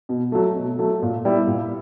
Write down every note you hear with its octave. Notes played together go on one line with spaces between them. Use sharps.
B2
F#3 A3
B2
F#3 A3
A#2
G3 B3 E4
A#2